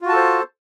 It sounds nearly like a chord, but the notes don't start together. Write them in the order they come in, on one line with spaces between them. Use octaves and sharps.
F4 F#4 A5 A4 C5